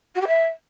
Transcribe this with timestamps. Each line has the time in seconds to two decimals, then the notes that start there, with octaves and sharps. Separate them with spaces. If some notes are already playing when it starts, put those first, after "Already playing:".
0.14 F#4
0.21 G4
0.27 E5